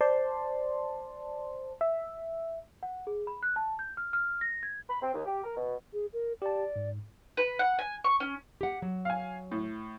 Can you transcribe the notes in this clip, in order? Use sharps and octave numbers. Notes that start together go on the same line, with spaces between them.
C5 D5 A5 C6
E5
F#5
G#4
B5
F#6
A5
G6
F6
F6
A#6
G#6
B5
C4
D#2
G4
A#4
B2
G#4
A#4
G4 D5 A5
G#2
B4
F#5
G#5
C#6
C#4
G4 F#5
F#3
F5 G#5
A2